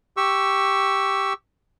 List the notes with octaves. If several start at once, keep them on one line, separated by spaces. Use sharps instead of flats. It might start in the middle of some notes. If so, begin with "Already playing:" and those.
G4 C#6 E6